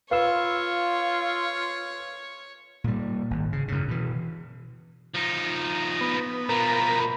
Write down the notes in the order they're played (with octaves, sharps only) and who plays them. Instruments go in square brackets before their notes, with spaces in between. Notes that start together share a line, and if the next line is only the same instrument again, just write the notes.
[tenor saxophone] F4 [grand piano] B4 [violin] C#5 [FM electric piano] F5 C6 E6
[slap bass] A#2 G3
G#1
C#3
F#2 C#3
B2 E3
[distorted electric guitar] F3 D#4
[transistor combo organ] B3
[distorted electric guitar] B2 F3 [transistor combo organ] A#4 B5